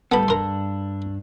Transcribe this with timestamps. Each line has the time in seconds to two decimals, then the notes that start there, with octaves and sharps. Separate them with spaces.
0.12 A2 G3 A3 B3 A4 B5
0.28 G2 D4 A#4 C6